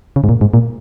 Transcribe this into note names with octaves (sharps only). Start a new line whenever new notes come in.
C#3
G#2
A#2
G#2
A#2